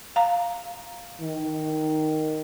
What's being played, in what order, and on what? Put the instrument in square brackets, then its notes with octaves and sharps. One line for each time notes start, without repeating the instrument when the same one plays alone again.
[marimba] F5 A#5
[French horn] D#3